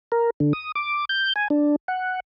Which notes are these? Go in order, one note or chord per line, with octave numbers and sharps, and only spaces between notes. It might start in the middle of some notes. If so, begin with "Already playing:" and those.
A#4
D3
D#6
D6
G6
G#5
D4
F#5